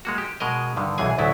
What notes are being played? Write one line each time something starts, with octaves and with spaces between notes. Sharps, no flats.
G#3 A#3 F#4
G4
B2 G#3 A#4 D#5
G2 D3 D#3
B1 E2 E3 G#4 G#5
A1 D2 F#3 B3 E4